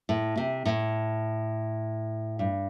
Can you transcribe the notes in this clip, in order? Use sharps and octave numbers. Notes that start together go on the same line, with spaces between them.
A2
C3
A2
G2